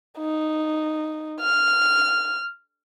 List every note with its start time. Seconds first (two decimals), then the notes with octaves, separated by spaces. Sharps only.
0.19 D#4
1.41 F6